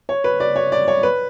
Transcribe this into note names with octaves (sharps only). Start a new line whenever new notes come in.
C#5
B4
D5
C#5
D5
C#5
B4